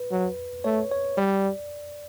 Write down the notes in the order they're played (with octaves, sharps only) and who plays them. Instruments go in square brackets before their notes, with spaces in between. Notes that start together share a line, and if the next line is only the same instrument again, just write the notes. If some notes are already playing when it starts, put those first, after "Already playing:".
Already playing: [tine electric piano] B4
[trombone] F#3
[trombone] A3 [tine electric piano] C#5
[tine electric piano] C#5
[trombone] G3 [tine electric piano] D5